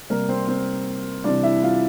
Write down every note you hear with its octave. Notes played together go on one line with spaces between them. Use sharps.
C3 G3 A#3 A#4
C4 C5
C4 C5
C3 E3 G3 D4 D5
E4 E5
F4 F5